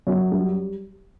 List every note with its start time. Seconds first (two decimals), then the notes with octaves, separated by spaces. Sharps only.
0.07 F#2
0.32 G3